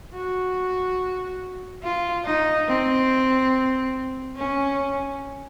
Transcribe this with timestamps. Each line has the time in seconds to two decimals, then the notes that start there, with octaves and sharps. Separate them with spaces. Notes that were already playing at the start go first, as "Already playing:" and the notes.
0.15 F#4
1.83 F4
2.25 D#4
2.68 C4
4.36 C#4